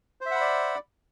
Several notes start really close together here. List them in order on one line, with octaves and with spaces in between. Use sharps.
C5 E5 F#5 B5 D5